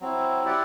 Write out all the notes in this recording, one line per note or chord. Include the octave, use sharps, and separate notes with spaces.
F#3 C4 E4
E4 G4 D5 F#5